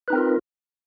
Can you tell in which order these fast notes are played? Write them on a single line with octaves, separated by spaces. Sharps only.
B4 D#4 C4 A#4 F4